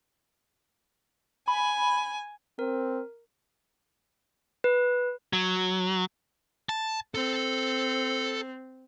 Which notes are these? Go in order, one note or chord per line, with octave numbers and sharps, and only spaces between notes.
G#5 B5
C4 A#4
B4
F#3
A5
C4 A4